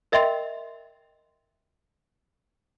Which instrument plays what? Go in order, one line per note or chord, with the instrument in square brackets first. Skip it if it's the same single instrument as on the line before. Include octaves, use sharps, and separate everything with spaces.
[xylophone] A#4 D#5 E5 G5 C6 A6